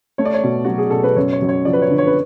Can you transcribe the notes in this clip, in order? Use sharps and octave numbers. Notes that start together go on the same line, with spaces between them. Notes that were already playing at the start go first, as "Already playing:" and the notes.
A3 C#5
D5
C#5
B2
F#3 F#4
G#4
B2 A4
B4
F#2 C#5
C#5
F#2
C#5
F3 D5
B4
C#5
D3
C#5
B4